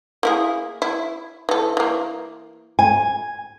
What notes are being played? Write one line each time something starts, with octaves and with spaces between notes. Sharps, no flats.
A#3 E4 G#4
E4
E3 A4
E3 A#3
G#5